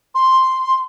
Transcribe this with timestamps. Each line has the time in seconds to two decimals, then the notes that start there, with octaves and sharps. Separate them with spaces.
0.14 C6